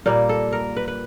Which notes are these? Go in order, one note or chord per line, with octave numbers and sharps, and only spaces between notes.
A#2 G3 A#3 A#4
A4
A#4
B4
B4